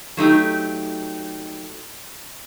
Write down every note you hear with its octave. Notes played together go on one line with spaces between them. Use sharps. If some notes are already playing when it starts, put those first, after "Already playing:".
F#3 A3 D#4 G4